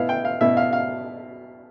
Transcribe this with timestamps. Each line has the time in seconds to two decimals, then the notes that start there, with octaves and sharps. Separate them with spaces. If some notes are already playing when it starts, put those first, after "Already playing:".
Already playing: B2 B3 E4 F5
0.09 G5
0.25 F5
0.41 B2 B3 E4 E5
0.57 F5
0.73 F5